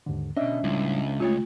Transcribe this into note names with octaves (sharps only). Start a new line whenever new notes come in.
D#2 G#2 D3
B2 D3 C#4 D4 D#5 E5
C#2 A2 G3 E4
C#3 A3 F4 C#5